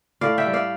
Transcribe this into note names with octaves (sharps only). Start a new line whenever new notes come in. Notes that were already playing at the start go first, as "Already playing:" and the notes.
A2 D5 F5
E5 G5
G3
D5 F5